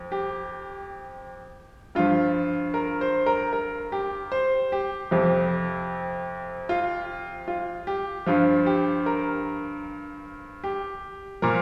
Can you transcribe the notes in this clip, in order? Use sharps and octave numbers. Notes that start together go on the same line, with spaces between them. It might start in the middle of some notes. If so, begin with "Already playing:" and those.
Already playing: F2
G4
G2 F3 F4
A#4
C5
A#4
A#4
G4
C5
G4
F2 C3 F3
F4
F4
G4
G2 F3 F4
G4
A#4
G4
A#2 F3 A#4